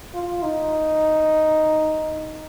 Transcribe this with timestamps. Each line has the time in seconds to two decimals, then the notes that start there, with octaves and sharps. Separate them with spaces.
0.14 F4
0.43 D#4